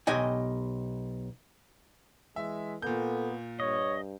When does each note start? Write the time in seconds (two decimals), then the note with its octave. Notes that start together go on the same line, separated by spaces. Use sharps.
0.07 B1 G4 D#5 G#5
2.36 E3 G#3 E5
2.82 A#2 B3 A4 G6
3.60 G2 C#5 D#5